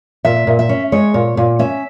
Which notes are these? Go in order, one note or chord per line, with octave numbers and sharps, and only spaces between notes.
A#2 E5
A#2
E5
C#4
G#3 C#5
A#2
A#2
C#4 E5